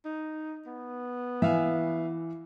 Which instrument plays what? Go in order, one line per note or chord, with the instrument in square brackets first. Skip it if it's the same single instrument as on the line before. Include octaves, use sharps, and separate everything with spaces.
[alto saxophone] D#4
B3
[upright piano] E3 [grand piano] E5 F5 G#5